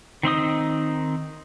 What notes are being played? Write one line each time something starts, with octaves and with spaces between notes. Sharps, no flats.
D#3 C4 D#4 D#6